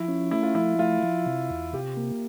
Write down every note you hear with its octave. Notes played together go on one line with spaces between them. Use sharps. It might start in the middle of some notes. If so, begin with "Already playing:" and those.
Already playing: F3 E4
C#4
A3 E4
F4
F3 E4
A3 F4
F3
C3
E2
C3 G4
A#3